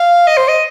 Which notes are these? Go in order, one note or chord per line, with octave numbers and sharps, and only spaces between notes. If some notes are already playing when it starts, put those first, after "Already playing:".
Already playing: F5
D#5
C5
D#5